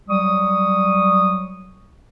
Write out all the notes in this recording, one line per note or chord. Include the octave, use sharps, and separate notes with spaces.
F#3 G3 C#6 D#6